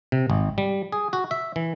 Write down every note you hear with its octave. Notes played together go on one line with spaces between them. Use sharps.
C3
G#1
G3
G#4
F#4
E5
E3